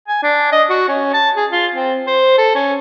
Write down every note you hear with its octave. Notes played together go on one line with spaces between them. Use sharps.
G#5
D4
D#5
F#4
C#4
A5
G#4
F4
C4
C5
A4
C#4